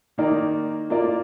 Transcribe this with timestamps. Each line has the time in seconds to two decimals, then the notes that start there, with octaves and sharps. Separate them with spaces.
0.18 D#3 A#3 D#4 A#4 D5
0.90 A#3 F4 A#4 D5